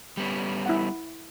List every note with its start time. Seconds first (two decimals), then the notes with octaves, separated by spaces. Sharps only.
0.17 G3 B3 C#4
0.66 E4 F#5